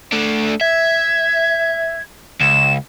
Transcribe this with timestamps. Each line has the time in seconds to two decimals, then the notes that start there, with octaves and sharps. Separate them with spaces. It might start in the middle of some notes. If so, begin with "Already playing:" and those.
0.12 A3 D4
0.61 E5 G#6
2.40 C#2 E7